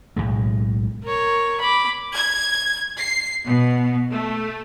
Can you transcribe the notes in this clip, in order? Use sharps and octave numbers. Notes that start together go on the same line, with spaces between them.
B1 E2 A2 G#3
A#4 C#5
B5 D6
G#6
C7
B2
A3